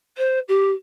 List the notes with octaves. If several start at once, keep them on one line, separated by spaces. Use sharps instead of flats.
C5
G4